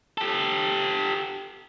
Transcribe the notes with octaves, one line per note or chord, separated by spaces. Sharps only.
G4 A4